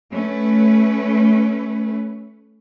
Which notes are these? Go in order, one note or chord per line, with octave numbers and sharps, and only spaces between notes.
A3 C#4 B4